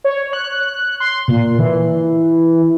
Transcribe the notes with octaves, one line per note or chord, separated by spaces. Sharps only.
C#5
F#6
C6
A#2
E3